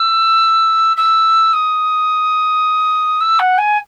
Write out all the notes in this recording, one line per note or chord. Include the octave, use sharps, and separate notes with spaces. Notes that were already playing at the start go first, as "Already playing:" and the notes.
Already playing: E6
E6
D#6
E6
F#5
G#5